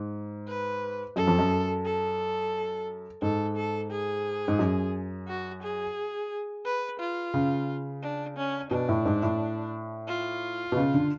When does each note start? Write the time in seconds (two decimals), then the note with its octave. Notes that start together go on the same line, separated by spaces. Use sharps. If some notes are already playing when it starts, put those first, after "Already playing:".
Already playing: G#2
0.48 B4
1.16 F#2 A4
1.27 F2
1.39 F#2
1.85 A4
3.22 G#2 A4
3.57 A4
3.91 G#4
4.48 G#2
4.59 F#2
5.28 F#4
5.63 G#4
6.65 B4
7.00 F4
7.34 C#3
8.03 D4
8.37 C#4
8.71 B2 D4
8.89 A2
9.06 G#2
9.23 A2
10.08 F4
10.72 B2
10.77 C#3
10.94 D3